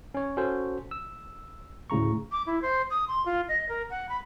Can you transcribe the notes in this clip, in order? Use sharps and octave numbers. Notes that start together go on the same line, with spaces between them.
C#4 C#5
C#4 F#4 A4 C5
E6
D2 A2 C#3 A#5 C#6
D6
E4
C5
D#6
C6
F4
D#5
A#4
F#5
B5